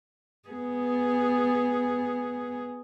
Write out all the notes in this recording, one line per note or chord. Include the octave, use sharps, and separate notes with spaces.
B3 G#4